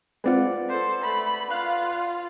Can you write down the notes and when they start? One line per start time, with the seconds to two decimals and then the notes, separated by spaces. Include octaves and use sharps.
0.24 G#3 C4 F4 B4 D5 F#5
0.69 A4 C5
1.02 A3 B5
1.50 F4 F5 F#6